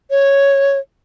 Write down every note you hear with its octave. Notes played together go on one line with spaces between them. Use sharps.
C#5